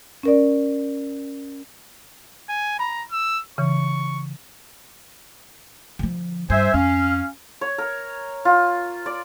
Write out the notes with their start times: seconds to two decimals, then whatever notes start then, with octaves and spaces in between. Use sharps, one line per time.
0.23 C#4 A#4 D5
2.49 G#5
2.79 A#5 B5
3.11 E6
3.58 C#3 E3 C#6
5.99 D3 F3
6.50 G2 C5 E5 G#5
6.74 F2 C#4 F5
7.61 C#5
7.78 A#4
8.45 F4
9.06 D5